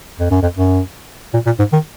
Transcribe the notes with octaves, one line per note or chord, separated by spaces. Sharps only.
F2
F#2
F2
F#2
A#2
A#2
G#2
D#3